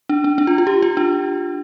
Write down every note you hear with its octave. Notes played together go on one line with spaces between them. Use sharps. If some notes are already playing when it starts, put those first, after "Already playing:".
D4
D4
D4
F4
F4
G4
F4
D4